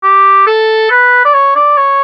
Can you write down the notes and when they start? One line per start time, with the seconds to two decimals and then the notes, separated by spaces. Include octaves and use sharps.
0.03 G4
0.47 A4
0.90 B4
1.25 D5
1.34 C#5
1.55 D5
1.77 C#5